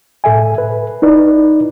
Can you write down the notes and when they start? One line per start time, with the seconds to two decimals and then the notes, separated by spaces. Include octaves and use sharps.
0.24 A2 A4 E5 G#5
0.58 B4
1.02 D#4 E4 B4 D5